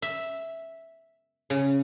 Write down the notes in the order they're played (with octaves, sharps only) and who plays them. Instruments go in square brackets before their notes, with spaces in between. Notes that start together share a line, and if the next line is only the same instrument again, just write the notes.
[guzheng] E5
C#3